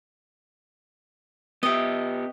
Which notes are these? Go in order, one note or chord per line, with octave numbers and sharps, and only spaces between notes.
B3 G4 D#5 E5